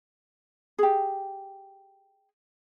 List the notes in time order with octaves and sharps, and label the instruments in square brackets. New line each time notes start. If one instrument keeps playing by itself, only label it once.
[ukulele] G4 G#4